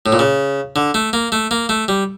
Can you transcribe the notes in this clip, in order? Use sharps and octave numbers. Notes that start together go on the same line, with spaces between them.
A2
A#2
C#3
D3
A3
A#3
A3
A#3
A3
G3